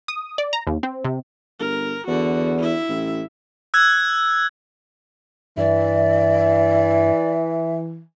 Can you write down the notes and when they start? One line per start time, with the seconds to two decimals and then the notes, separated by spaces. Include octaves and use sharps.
0.08 D#6
0.38 D5
0.53 A#5
0.67 D#2
0.83 C4
1.05 C3
1.60 G1 A#4
2.08 E2 D3 F#4
2.58 E4 E5
2.89 A1
3.74 E6 F#6 G#6
5.57 G2 E3 D5 E5